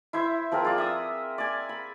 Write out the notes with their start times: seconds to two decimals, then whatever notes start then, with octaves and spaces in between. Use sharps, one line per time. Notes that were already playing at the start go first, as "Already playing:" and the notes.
0.13 E4 C5 E5
0.51 F3 C4 G#4 A#4
0.65 F4 D5
0.78 E5 D#6 E6
1.38 D5 G#5
1.69 B5